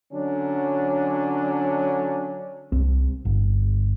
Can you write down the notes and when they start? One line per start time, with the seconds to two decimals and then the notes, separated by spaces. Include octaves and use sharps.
0.13 D3 F#3 C#4 D4
2.72 C2 C4
3.25 G1